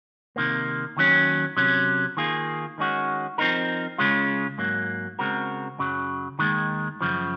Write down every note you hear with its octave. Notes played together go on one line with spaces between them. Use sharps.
C3 D#3 A#3
D#2 D#3 F#3 C#4
C3 F#3 C#4
D#3 A#3 F4 G#4
D#3 G#3 C#4 F#4
F3 C4 D#4 A#4
C#3 G#3 C#4 F4
G#2 F#3 A#3
C#3 G#3 C4 F#4 A#4
F#2 C#3 F#3
D#2 D#3 G#3
F#2 C#3 F3